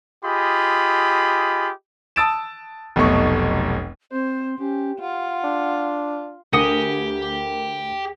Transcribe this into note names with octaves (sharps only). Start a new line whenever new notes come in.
F4 G4 G#4 D#5 B5
A5 D#6 E6 A6 D7 E7
F1 B1 B2 A3 C#6
C4 C5
C#4 G4
F4 F#5
D4
D2 G4 A#4 F#5 G#5 D#6 A#6 D#7